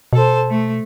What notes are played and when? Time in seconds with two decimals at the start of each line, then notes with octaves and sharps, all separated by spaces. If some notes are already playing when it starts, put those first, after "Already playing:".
0.13 B2 A4 C5
0.49 A3